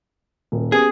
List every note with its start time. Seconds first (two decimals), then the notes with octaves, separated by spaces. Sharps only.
0.52 D#1
0.72 B3 C#4 G4 G#4